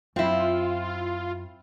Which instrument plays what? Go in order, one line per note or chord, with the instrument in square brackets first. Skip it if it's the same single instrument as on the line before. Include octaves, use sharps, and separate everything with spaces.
[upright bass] F#2 [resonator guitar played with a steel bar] C4 E4 [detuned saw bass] F4